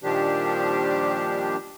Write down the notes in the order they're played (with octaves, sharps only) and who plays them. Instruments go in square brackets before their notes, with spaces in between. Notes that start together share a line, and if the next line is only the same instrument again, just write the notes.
[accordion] A#2 D#3 F3 G3 D4 G4